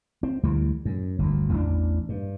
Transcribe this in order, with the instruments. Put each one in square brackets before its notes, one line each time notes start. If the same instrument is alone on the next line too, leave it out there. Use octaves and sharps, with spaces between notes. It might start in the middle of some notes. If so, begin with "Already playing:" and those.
[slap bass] C4
D2 E3 G3 A3
F#2
G1 D2
A1 E2 C4 D4
G2